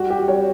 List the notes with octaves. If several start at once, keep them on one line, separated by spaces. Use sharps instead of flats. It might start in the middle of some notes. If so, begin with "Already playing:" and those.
Already playing: G3 F#4
G4
G3 C#5